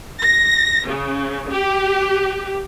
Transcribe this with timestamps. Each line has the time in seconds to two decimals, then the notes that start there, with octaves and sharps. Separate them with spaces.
0.22 A#6
0.88 C#3
1.52 G4